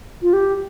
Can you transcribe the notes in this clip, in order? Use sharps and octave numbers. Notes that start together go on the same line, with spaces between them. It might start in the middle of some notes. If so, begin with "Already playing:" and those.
F4
G4